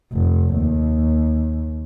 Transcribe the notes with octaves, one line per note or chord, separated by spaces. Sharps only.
F1
D#2